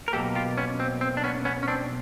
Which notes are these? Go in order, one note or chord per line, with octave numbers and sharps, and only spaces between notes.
A#4
B2 F#3 A#3 G4 A4
F4 G4
B3 C#4
C4
C4
D4
B3 C#4
B3 C#4
C#4
C4 D4